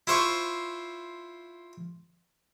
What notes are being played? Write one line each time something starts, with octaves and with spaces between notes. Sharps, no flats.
E4 F4 C5 C#6